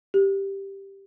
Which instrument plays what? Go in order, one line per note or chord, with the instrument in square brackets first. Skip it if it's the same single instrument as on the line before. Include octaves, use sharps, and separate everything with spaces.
[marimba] G4